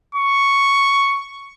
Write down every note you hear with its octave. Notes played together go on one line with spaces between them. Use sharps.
C#6